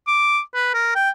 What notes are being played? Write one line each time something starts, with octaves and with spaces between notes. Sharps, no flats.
D6
B4
A#4
G5